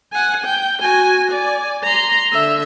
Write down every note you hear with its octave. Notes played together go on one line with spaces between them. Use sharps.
F#5 G#5
G5
F#4 G#5
D5 G#5
A#5 C6
D3 E5